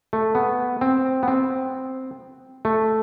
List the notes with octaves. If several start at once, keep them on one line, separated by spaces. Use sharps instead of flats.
A3
B3
C4
B3
C4
A3